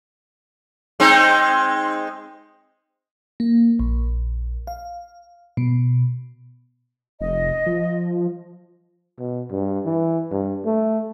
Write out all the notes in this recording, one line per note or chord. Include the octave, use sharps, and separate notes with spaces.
G#3 C4 D#4
A#3
A#1
F5
B2
F1 D#5
F3
B2
G2
E3
G2
A3